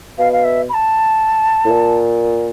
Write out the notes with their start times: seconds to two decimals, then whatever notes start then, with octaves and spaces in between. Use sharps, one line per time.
0.18 B2 F5
0.33 F5
0.44 E5
0.69 B5
0.74 A5
1.65 A2
1.70 A#2